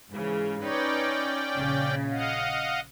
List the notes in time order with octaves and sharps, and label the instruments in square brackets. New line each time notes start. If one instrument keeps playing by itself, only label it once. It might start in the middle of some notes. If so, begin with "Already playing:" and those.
[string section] G#2 C#3 E3
[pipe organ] C#4 D5 G5 [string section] D#4 B4 C#5
[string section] A#1 C#3
[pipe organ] D#5 F5 F#5